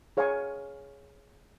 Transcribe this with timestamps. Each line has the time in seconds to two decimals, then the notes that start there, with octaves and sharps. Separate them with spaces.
0.17 G#4 C#5 F5 G#5 C#6